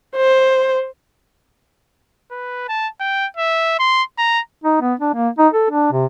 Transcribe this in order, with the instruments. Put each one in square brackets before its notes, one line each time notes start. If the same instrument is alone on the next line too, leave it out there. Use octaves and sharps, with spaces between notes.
[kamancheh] C5
[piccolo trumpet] B4
A5
G5
E5
C6
A#5
[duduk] D#4
B3
D4
A#3
D#4
A4
D4
C3